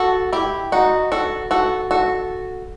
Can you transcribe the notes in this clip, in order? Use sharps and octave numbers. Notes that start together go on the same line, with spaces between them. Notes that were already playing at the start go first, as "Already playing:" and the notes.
Already playing: F#4 A4
E4 G4
D#4 F#4
F#4 A4
F#4 A4
F#4 A4